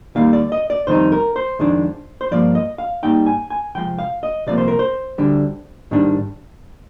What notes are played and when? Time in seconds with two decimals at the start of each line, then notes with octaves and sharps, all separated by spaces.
0.15 D#2 D#3 G3 A#3 F5
0.33 D5
0.52 D#5
0.70 D5
0.87 F2 D#3 G3 C4 D#4 C5
1.12 A#4
1.36 C5
1.59 F2 D#3 G#3 D4
2.21 C5
2.31 G2 F3 A#3 D5
2.55 D#5
2.78 F5
3.03 G#2 G3 A#3 D#4 G5
3.26 G#5
3.50 G#5
3.75 C3 F3 G#3 G5
3.99 F5
4.23 D#5
4.47 C2 C3 F3 A#3 D5
4.58 C5
4.68 A#4
4.79 C5
5.18 D2 D3 G3 D4
5.91 G#2 D#3 G3 D4